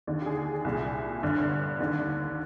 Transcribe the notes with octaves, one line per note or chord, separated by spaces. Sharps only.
D#2 D3
G4
G#4
G#4
C2 A#2 G#4
G1 G2 D3
D#2 D3